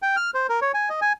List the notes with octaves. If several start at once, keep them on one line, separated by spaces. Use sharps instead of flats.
G5
F6
C5
A#4
C#5
G#5
D#5
G#5